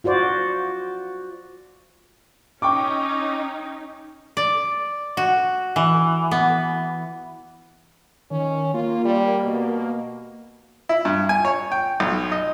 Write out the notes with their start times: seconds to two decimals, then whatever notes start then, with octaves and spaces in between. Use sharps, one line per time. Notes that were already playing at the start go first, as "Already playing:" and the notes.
0.04 F4 F#4 C5 D5
2.62 C#4 D#4 G5 C#6 D6
4.37 D5
5.17 F#4
5.76 E3
6.31 B3
8.31 D#3 C#4
8.74 A#3 F4
9.05 G3
9.44 B2
10.89 E4
11.05 G2
11.29 G#5
11.45 C#5
11.72 G5
12.00 B1
12.32 D#5